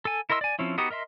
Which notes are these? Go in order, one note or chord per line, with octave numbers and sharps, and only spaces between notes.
A4 G#5
E4 A#4 D#5 C6 E6
D5 G#5
F3 C4 C#4 E4
B3 D#4 F#4 G4 D#6
A#4 D#5 E5 C6